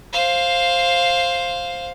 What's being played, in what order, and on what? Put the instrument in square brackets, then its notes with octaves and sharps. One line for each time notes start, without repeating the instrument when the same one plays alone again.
[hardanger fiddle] C5 F5